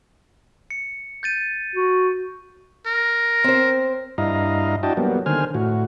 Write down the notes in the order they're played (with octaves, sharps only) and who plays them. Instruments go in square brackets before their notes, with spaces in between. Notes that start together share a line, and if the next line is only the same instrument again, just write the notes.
[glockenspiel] C#7
G6 A6 D#7
[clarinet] F#4
[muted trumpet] A#4
[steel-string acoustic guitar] C4 C5
[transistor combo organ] G2 E4 D#5 F5 A#5
D4 E4 F#4 D#5 G5 A5
F#3 G3 A#3 B3
D3 D#3 C5 G#5 F6
A2 F#4